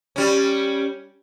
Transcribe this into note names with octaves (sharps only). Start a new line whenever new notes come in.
G3 C#4